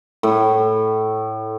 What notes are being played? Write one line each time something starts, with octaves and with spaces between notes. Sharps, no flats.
A2